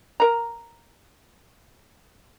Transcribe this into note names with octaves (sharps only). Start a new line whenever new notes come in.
A#4 A#5